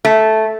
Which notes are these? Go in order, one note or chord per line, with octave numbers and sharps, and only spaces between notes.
A3